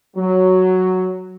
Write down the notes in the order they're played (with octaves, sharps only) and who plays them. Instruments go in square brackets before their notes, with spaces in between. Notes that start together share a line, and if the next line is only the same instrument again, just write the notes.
[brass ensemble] F#3